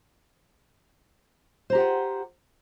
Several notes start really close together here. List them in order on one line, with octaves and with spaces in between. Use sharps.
C5 A#5 G4 F#5 F4